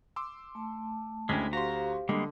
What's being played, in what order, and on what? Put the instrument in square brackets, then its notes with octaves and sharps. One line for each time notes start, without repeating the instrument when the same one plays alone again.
[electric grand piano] C6 D6 E6
[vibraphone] A3 A5
[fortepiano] D2 [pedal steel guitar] G#3 C#4 E4 [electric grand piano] G5 B6
[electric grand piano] F#4 C6 [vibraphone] G4 C5 F5 [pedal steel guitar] A#5
[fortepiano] D3 [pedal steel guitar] G3 G#3 A#3 [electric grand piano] D#5